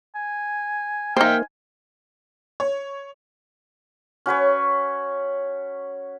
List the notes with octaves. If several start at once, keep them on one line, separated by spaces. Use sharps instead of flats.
G#5
A#3 D#4 C5 E5 G5 G#5 F6
C#5
C#4 F#4 B4 C#5